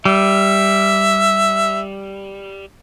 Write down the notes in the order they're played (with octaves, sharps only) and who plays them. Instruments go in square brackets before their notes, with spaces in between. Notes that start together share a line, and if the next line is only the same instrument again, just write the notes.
[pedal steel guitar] G3 [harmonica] E5